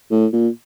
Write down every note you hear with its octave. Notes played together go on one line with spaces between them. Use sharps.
A2
A#2